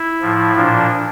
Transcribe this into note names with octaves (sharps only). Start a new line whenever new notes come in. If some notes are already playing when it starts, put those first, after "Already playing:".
Already playing: E4
A2 F3
A#2 F3 D4